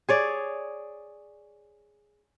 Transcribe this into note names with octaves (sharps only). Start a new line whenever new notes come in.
G#4 C#5 D5